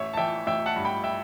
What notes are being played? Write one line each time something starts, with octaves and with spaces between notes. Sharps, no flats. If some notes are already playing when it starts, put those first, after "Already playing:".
Already playing: A1 C#5 E5
A5
E3 E5 G5
A1 E5 G5
F#5 A5
G2
G5 B5
E5 G5